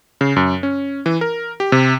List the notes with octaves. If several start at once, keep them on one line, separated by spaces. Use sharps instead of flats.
C#3
F#2
C#4
E3
A#4
G4
C3